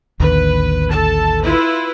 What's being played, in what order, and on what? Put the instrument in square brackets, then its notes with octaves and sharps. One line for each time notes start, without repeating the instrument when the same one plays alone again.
[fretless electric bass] A1 D#2 D3 [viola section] B4
[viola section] A4 A5
E4 F4 B4